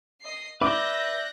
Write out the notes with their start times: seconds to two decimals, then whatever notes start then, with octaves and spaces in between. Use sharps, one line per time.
0.21 D#5 C7
0.61 B4 D5 E5 D6 F#6 G6 A#6